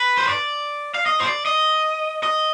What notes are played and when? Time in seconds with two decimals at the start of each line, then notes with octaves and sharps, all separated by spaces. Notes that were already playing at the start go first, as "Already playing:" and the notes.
Already playing: B4
0.17 C5
0.28 D5
0.94 F5
1.06 D#5
1.20 C5
1.25 D5
1.46 D#5
2.23 D#5